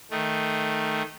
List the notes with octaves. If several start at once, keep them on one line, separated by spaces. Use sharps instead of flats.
D#3 A3